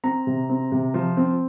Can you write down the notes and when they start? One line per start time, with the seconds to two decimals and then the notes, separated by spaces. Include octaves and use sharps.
0.04 C4 A#5
0.27 C3
0.49 C4
0.72 C3
0.94 F3
1.17 C4